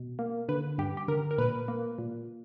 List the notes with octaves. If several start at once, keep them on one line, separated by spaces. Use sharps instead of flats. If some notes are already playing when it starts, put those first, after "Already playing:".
Already playing: B2
A#3
D3 B4
G2 G4
G4
D3 A#4
A#4
A#2 B4
A#3
A#2